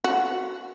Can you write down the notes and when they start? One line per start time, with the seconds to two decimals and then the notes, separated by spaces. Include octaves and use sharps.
0.04 F#4